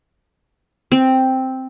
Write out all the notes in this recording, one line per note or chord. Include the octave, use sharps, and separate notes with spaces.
C4